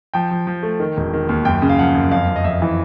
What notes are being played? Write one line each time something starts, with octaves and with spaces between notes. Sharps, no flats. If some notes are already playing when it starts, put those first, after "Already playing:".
F3 G5
F3
F3
A3
D#3
E1
D#3
D#2
F#2 G5
C#3
F5
F3 F#5
F#2
F2 F5
F2
D#5
F2 E5
E3